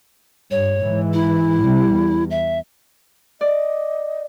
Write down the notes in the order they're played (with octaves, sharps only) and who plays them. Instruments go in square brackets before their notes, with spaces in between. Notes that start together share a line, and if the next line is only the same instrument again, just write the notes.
[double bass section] G2 [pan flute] C#5
[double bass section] G#2 E3
[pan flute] E4
[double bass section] C3 G3
E2
[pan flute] E5
[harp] D5 [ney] D#5